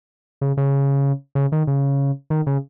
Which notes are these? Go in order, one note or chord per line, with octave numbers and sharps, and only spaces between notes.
C#3
C#3
C#3
D#3
C#3
D#3
C#3